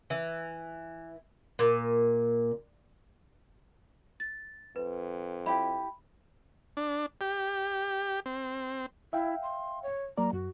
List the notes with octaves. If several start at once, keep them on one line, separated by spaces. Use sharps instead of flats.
E3
A#2
A6
F2 B4
E4 G4 G5 B5
D4
G4
C4
E4 E5 F5 G5
C6
C#5
F#3 A#3 D5 A#5
F#2 F#4